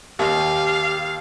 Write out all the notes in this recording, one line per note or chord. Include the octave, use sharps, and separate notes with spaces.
D#2 G4 F5